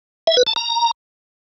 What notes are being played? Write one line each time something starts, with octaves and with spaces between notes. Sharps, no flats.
E5
B4
A5
A#5